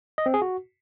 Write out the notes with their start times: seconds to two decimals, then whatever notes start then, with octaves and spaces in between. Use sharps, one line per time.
0.18 D#5
0.26 C4
0.34 G#4
0.42 F#4